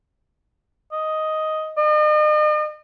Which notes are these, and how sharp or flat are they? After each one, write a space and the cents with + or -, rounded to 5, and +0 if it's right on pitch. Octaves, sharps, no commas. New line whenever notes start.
D#5 +5
D#5 -40